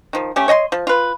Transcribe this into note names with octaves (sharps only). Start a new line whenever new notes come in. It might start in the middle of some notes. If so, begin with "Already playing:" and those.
D#3 F3
A3 C#4 G4
C#5 D#5 G5 C6
F3
F4 B4